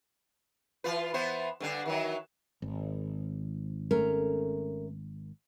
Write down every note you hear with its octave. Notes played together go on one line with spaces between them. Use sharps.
E3 F4 B4
E3 B3 C5
G2 D3 D4
D#3 E3 F#3
G#1
A3 C#4 A#4